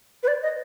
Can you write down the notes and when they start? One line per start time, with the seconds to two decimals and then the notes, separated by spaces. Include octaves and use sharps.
0.23 B4
0.28 D5
0.42 D#5